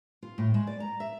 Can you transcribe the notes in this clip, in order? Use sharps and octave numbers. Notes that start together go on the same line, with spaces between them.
F4
A2
G#3
D5
A#5
E5